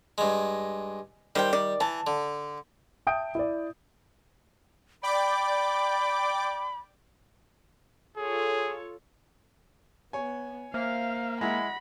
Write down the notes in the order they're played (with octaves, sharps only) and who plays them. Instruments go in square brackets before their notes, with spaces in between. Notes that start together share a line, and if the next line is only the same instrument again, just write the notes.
[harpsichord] G2 G#3
[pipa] D#3 C5 G5 [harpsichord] G3
[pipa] D#3 D5
[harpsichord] E3 [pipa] A5
[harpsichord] D3
[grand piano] E5 G5 A5 D#6 G6 D7
E4 D5
[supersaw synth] D5 G5 D6 [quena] B5
[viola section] F4 A4 C#5 [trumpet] G#4
[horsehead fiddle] B3 [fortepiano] C#5 G#5
[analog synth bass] A#3 [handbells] C5 E5 F6 [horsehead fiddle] F5
[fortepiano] G#3 E4 [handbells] F#5 A#6 [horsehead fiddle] B5